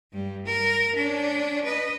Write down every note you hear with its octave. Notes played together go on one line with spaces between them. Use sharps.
G2 G3
A#4
C#4 D4
B4 D#5